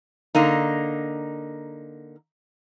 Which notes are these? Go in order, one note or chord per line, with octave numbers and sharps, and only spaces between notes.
D3 A#3 D#4